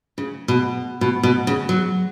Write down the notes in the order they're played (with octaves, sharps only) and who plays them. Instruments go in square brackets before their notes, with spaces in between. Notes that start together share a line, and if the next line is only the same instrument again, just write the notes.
[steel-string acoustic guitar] C#3
B2
B2
B2
C#3
F#3